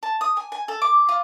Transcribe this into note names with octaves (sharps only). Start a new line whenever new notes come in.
A5
D#6
G#5
G#5
A4
D6
F4